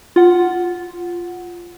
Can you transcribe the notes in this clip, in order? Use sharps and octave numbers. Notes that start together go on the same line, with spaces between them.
F4 F#5